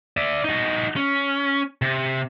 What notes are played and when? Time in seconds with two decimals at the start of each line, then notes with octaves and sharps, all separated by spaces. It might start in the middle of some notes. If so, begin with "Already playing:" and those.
0.17 D5 E5
0.44 D#4 F#4
0.96 C#4
1.82 C3